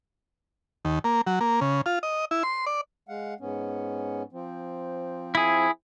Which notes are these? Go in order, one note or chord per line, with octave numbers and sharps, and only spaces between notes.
D#2
A#3
F#3
A#3
C#3
F4
D#5
E4
C6
D5
G#3 F5 F#5
G#2 B3 C#4
F3 C4
E4 G#4